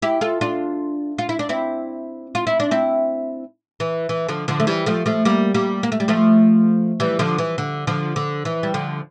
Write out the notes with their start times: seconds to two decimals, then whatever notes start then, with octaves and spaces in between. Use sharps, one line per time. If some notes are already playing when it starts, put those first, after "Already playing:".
0.02 E4 G4
0.21 F4 A4
0.41 D4 F4
1.19 F4
1.29 E4
1.39 D4
1.49 C4 E4
2.35 F4
2.47 E4
2.60 D4
2.71 C4 E4
3.80 E3
4.09 E3
4.28 D3 F3
4.48 D3 F3
4.60 A3
4.67 E3 G3
4.86 F3 A3
5.06 F3 A3
5.25 G3 A#3
5.55 G3 A#3
5.83 A#3
5.92 A3
6.00 G3
6.08 F3 A3
7.00 E3 G3
7.19 D3 F3
7.38 E3
7.58 D3
7.87 D3 F3
8.16 D3
8.45 E3
8.63 G3
8.74 D3 F3